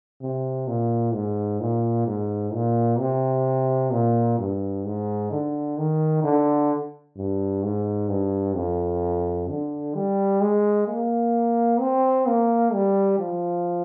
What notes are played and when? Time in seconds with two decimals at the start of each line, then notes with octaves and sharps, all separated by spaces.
0.21 C3
0.68 A#2
1.14 G#2
1.60 A#2
2.07 G#2
2.53 A#2
2.99 C3
3.92 A#2
4.39 G2
4.85 G#2
5.32 D3
5.78 D#3
6.24 D3
7.17 G2
7.64 G#2
8.09 G2
8.56 F2
9.49 D3
9.95 G3
10.41 G#3
10.88 A#3
11.80 C4
12.27 A#3
12.73 G3
13.19 F3